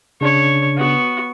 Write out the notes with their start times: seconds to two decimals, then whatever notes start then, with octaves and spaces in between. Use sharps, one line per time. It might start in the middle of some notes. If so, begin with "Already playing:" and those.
0.21 C#3 D4 C#5
0.77 B3 F#4